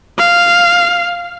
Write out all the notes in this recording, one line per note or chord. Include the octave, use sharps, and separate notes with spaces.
F5